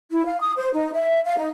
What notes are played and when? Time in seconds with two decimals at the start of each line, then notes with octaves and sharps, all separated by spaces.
0.11 E4
0.25 F5
0.40 D#6
0.57 C5
0.73 D#4
0.93 E5
1.26 F5
1.37 D#4